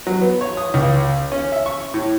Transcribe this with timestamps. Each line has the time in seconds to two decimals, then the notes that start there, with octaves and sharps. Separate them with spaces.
0.07 F#3
0.21 B3
0.41 C#5
0.57 D#6
0.74 C#2
1.32 C#4
1.52 E5
1.66 C#6
1.94 A2